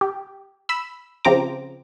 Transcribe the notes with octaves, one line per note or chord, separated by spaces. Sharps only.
G4
B5 E6
C#3 F3 C4 C5 A#5 D6